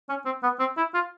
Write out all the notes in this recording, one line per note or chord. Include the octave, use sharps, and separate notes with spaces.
C#4
C4
B3
C4
E4
F4